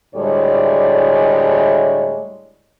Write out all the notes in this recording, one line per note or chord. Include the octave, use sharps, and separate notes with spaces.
D2 A2 G3 G#3 C#5 D5